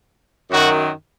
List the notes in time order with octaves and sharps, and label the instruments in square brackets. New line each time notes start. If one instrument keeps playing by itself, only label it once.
[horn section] F#2 D#3 F#3 F#4